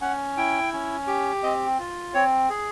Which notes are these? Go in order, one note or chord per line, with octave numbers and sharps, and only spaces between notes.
C#4 F#5
E4 G5
C#4
G4
C4 D#5
F4
C4 C#5
G#4